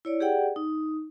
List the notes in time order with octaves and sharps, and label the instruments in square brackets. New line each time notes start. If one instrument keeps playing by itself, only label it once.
[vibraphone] E4 C#5 D5
G4 G#4 D5 F#5 G5
D#4